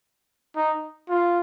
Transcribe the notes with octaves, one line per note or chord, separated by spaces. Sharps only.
D#4
F4